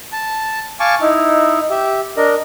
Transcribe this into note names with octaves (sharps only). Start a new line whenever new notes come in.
A5
F5 G#5 A5 C#6 D6
D#4 E4
G4 E5
D4 A#4 D#5